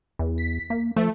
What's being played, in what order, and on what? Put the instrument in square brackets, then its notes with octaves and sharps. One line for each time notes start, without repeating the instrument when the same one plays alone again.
[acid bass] E2
[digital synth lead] B6
[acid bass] A#3
[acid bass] F3 [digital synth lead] A3